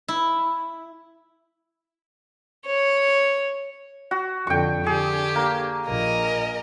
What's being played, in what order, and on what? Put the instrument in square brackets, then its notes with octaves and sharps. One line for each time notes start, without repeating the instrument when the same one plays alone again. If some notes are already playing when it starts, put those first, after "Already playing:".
[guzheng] E4
[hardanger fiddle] C#5
[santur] F#4
[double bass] F2 D3 [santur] G5 C#6
[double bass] D3 [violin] G4 [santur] G#4
[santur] A#3
[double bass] A#1 [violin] A#4 D#5